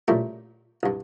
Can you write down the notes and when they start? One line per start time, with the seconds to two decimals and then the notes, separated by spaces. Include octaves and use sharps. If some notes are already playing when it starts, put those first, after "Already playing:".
0.08 A#2 C#3 G3 A3 E4
0.83 C2 G2